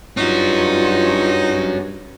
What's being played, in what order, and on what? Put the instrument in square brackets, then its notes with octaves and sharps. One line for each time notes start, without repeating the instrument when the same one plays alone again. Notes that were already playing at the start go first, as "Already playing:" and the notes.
[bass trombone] G2 [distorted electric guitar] C#4 F#4 [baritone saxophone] D#4 [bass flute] F4